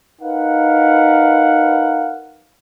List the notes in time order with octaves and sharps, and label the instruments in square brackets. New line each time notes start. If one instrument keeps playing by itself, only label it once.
[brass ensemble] D#4 A#4 B4 F5 F#5